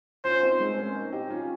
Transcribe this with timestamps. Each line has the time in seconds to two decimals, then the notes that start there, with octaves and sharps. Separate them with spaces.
0.24 C#4 F4 C5
0.43 C4 D#4
0.60 G#3 C4
0.73 C4
0.78 A#3 C#4
0.95 C4 D#4
1.13 D#4 G4
1.30 C#4 F4